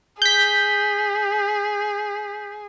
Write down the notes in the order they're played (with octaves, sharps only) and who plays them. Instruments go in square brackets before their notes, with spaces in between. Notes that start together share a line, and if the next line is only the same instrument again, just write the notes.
[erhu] G#4 [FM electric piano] G6 B6